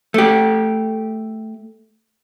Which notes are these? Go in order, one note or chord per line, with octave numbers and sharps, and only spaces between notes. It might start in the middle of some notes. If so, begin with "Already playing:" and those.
A3 G4